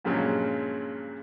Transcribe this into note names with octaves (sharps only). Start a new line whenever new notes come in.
G2 A#2 C#3 F3 F#3 G#3